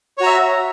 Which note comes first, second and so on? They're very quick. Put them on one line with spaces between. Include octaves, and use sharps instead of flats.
C#5 F#4 A#5 E5